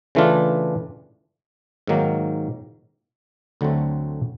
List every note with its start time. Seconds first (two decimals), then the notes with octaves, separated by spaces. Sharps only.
0.15 C#3 E3 A3 D4 F4
1.87 G#2 D#3 F#3 A#3
3.61 D2 D3 F#3 A3 C4